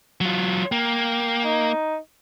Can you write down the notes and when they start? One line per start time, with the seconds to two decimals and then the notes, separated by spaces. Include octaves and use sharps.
0.21 F#3 F4
0.72 A#3 G5
1.44 D#4